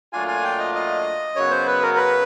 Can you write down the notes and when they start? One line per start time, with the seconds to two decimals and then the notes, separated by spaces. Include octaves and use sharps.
0.13 A#2 F#3 A3 D4 F4 G#5
0.28 G#5
0.44 G5
0.59 D#5
0.75 D#5
1.36 F#2 C#3 F#3 B3 C#5
1.51 C5
1.67 B4
1.82 A#4
1.97 B4